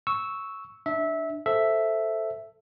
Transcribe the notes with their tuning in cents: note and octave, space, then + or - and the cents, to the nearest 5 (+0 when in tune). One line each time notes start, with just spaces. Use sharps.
C#6 +0 E6 -10
D4 +10 E5 -20
A4 +0 C5 +0 E5 +0